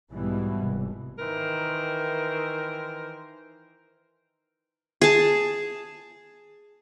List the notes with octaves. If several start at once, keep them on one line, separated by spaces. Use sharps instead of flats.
B1 G#2 B2 E3 G3
F1
D#3 E3 A#4 C5
G#4 A5